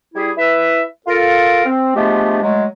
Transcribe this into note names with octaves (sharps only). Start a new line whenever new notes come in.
G3 E4 G#4
E4 B4 E5
F4 A4 A#4
C4
F3 G#3 A3 B3 D4 G4
F#3 G#3 A3